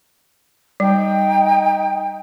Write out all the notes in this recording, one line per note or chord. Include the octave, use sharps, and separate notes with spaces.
G3 D#4 G5